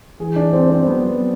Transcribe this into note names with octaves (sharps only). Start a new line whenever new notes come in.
E3 G#4
D4
C4
C4
F#3 B3